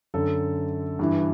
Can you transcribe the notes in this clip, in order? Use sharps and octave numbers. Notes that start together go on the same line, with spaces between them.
F#2 D3 A4
G2 E3